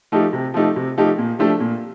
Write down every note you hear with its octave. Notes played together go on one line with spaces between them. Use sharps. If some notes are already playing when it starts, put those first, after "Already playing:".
F3 A3 D#4 G4
C3
F3 A3 D#4 G4
C3
F3 A3 D#4 G4
A#2
F3 A3 D4 G4
A#2